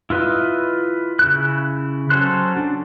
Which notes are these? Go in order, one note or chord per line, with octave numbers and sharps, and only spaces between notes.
E4 F4 B4 D#5
C#3 E4 F#6
F#3 C#4 A4 C5 F#6
D4